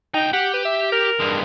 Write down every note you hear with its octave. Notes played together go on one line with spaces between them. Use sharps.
C#2 D#4 G5
G4 F#5
B4
E5
A#4
G2 G#3